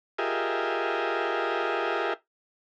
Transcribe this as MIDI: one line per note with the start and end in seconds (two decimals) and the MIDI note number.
0.19 2.13 65
0.19 2.13 67
0.19 2.13 68
0.19 2.13 70
0.19 2.13 75
0.19 2.13 76